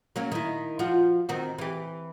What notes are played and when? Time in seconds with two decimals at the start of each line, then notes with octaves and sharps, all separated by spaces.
0.16 F#3 A#3 C#4
0.32 D#3 E4
0.79 F3 F4 F#4
1.29 D#3 C4 F#4
1.58 E3 G4